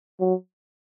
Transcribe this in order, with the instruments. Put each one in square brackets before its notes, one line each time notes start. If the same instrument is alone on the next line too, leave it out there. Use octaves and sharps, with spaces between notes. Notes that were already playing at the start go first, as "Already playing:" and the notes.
[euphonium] F#3